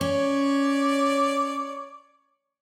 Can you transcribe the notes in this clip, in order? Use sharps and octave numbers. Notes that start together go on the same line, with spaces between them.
C#4 C#5 D5